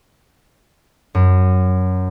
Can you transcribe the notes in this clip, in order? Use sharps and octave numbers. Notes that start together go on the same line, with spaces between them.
F#2